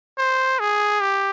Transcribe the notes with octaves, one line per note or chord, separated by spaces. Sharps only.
C5
G#4
G4